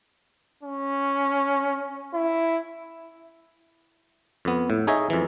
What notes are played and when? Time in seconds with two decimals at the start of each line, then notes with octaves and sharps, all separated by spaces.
0.63 C#4
2.14 E4
4.45 F2 B3
4.70 A2
4.87 D#4 G#4 C#5 D#5 E5
5.10 F2 E3